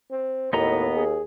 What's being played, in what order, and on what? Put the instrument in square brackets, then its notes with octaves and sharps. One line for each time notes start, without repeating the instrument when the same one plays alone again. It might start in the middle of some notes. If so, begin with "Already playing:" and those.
[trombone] C4
[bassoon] D#2 [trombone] A2 [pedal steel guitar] B3 D#5 A#5
[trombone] G#4